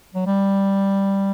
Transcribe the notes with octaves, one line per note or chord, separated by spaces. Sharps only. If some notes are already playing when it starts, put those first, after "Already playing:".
F#3
G3